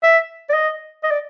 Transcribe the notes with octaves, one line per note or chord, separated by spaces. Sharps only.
E5
D5
D#5
D#5
D5